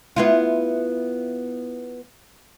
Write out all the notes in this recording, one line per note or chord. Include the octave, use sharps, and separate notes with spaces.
B3 E4 F4